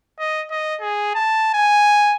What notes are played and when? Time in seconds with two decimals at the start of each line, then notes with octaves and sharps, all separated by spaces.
0.19 D#5
0.51 D#5
0.81 G#4
1.15 A5
1.54 G#5